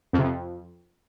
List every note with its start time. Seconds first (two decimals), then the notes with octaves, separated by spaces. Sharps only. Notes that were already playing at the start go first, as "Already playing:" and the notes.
0.13 F2
0.19 C3
0.24 F2